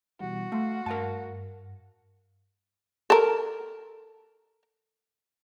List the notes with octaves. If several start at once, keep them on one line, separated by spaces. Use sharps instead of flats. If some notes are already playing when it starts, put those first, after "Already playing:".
B2 E3 G3 F#4
A3 F5 C6
G2 A#4 F5 A5
A4 A#4